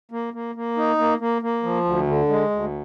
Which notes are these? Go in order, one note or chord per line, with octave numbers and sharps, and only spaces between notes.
A#3
A#3
A#3
D#4
A#3
A#3
A#3
F3
D2
D3
G#3
D2